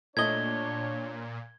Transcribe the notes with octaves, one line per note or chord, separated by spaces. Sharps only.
A#2 A3 D4 C#5 D#5 G#6 G7